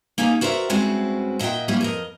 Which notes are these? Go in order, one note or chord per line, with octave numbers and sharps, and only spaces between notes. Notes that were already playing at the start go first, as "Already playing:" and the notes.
A#3 C#4 D#4 G4 G#4
F#4 A#4 C5 D5 E5
G2 G#3 C4 C#4 E4 F#4
A#2 D#5 E5 F#5 G5
F#3 G3 A3 A#3 C#4 E4
F2 A#4 D#5